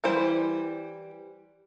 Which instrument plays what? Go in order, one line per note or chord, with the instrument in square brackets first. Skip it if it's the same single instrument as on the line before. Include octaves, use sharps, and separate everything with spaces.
[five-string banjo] E3 G3 E4 C5